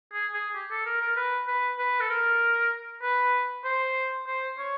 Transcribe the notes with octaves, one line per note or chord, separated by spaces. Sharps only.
G#4
G#4
G4
A4
A#4
A#4
B4
B4
B4
A4
A#4
B4
C5
C5
C#5